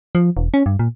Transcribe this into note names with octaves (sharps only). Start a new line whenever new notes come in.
F3
E1
C#4
G2
A#2